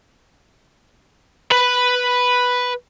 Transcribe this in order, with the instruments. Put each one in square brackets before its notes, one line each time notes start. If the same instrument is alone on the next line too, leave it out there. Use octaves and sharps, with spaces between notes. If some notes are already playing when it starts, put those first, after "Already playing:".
[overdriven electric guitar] B4 B5